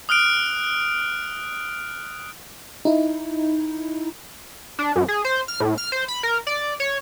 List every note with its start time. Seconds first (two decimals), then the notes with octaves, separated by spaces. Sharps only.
0.09 D#6 F6 F#6 D7
2.85 D#4 E4
4.79 D4
4.96 F#2
5.08 G#4
5.25 C5
5.48 F6
5.60 A2
5.78 F6
5.92 C5
6.08 B5
6.23 A#4
6.47 D5
6.80 C#5